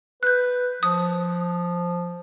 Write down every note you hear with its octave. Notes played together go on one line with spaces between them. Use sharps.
B4 F#6 G6
F3 D#6